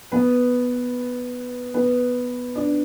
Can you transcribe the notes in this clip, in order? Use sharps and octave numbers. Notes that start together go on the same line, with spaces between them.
B3 B4
B3 B4
D4 D5